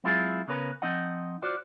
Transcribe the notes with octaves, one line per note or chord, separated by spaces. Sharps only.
F#3 G#3 C4 E4 F4 G#4
C#3 B3 C#4 A#4 B4
F3 C4 D#4 D#5 F#5
F4 F#4 C5 D5